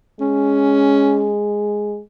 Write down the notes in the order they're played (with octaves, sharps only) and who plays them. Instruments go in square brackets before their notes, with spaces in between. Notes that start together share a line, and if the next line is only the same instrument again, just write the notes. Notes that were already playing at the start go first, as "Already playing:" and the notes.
[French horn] G#3 [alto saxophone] C#4